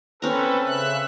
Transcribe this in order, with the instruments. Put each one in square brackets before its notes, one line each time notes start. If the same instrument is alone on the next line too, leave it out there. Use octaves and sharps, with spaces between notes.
[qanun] C4 C#4 A#5 [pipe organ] A4 B4
[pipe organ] C#3 E5 F#6